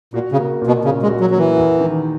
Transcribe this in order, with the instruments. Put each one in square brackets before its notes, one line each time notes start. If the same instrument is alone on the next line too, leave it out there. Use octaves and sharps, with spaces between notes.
[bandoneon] A#2 [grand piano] F#4
[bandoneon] C#3
[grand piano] A#3
A#2
[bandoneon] B2
[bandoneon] C#3 [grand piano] C#4
[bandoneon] G#3
[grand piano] F#4
[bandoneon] F#3
[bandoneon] F#3 [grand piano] A#3
[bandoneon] E3
[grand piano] E2
D#3